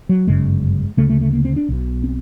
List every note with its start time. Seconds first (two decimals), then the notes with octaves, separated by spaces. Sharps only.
0.09 F#3
0.27 G1 F#2 C#3 G#3
0.97 D2 C#3 A3
1.10 A3
1.21 A3
1.33 A#3
1.45 C4
1.56 D4
1.69 B1 B2
2.04 C4